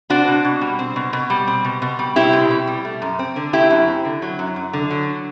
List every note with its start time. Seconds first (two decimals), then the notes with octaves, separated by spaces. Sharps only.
0.10 C4 D4 F#4
0.27 B2
0.45 B2
0.61 G3
0.79 C4
0.96 B2
1.13 B2
1.30 G3
1.47 C4
1.65 B2
1.82 B2
1.99 G3
2.16 C4 E4 G4
2.33 B2
2.50 B2
2.67 G3
2.85 A3
3.02 F#2
3.19 C4
3.36 D3
3.53 A3 E4 G4
3.71 F#2
3.88 C4
4.05 D3
4.22 F#3
4.39 F#2
4.56 F#2
4.73 D3
4.90 F#3